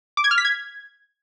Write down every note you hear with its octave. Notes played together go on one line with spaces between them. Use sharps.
D6
G#6
F6
B6
G#6